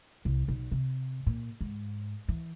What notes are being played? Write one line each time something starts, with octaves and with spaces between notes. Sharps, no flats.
C2
B1
C3
A#2
G#2
E3